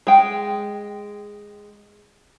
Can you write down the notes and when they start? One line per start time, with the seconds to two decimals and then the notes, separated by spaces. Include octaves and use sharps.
0.07 G#3 G5